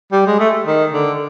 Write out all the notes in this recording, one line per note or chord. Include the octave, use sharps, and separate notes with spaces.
G3
G#3
A3
D#3
D3